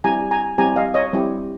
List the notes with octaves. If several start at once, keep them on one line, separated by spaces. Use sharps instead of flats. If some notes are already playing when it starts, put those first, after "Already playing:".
G3 C4 E4 G4 G#5 A#5
G#5 A#5
G3 C4 E4 G4 G#5 A#5
D#5 F5
C#5 D#5
G3 C4 E4 G4